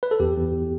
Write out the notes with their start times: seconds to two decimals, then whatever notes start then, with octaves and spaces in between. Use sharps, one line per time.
0.03 B4
0.11 A4
0.20 E2 G4
0.37 E2